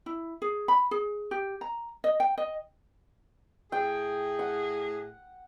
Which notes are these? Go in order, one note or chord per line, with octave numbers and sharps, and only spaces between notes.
E4
G#4
B5
G#4
G4
A#5
D#5
G5
D#5
A2 G#4 G5
F#5